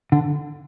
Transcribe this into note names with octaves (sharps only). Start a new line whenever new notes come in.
D3